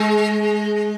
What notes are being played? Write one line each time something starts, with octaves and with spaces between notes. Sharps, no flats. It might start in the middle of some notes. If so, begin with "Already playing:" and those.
Already playing: G#3